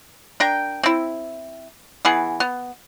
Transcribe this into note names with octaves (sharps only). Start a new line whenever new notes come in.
D4 A#4 G5
C4 E4
E3 B3 G#4
B3